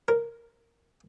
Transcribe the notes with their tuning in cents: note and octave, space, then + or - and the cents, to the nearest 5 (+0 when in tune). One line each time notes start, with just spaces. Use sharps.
A#4 +0